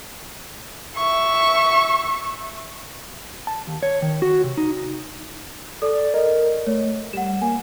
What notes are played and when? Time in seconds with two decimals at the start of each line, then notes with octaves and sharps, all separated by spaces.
0.96 E5 C#6
3.47 A5
3.67 D#2
3.83 C#5
4.02 D#3
4.22 F#4
4.44 C3
4.57 D#4
5.82 A4 D5
6.14 A#4 D#5
6.67 A3 C#5
7.13 G3 F#5 E7
7.42 A#3 G#5